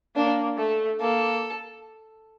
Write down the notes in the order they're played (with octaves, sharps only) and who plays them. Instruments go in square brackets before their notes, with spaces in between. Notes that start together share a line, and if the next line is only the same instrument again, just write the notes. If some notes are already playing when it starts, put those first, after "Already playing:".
[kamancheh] A#3 [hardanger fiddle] D4
[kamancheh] A3 [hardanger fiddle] A4
[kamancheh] A#3 [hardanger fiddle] A4